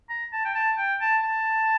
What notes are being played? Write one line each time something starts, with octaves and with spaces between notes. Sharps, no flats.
A#5
A5
G5
A5
G5
A5
A5